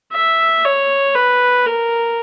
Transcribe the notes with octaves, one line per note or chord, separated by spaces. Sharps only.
E5
C#5
B4
A#4